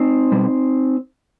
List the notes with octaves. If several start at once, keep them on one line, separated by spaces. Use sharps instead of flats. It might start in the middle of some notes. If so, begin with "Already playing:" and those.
Already playing: C4 D#4
B2 G3